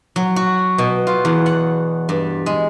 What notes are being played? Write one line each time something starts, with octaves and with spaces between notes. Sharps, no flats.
F#3
F#4
B2
F4
E2
F#5
G2
G#3